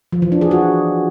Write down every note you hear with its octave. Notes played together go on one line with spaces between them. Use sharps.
F3
E3
D4
G#4
F#4